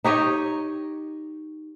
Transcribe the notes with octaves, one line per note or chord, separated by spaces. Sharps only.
D#4 G4 C#5 D#5